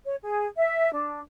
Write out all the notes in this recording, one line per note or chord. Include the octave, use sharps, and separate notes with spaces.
C#5
G#4
E5
D4